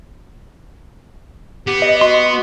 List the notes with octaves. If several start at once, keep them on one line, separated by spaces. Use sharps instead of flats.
B3 G4
D#5
F#4 C6